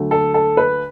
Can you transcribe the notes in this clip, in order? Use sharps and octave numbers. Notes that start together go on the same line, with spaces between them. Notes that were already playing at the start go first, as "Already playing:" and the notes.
Already playing: D2 D3 F#3 A3
A4
A4
B4